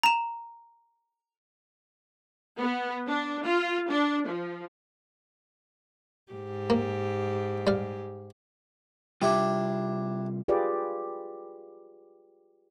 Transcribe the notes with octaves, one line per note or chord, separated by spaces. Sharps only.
A#5 E7
B3
D4
F4
D4
F3
G#2 G4
A#3
G3 F5
C3 G3 D4 E4 F4 G4
F4 G4 G#4 B4 D5